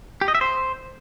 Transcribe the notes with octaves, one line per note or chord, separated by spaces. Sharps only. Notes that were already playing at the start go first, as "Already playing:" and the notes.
G4
D#5
E5
C5